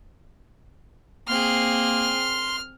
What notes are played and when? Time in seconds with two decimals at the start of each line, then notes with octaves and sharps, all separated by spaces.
1.28 A#3 C4 G#4 C6 F6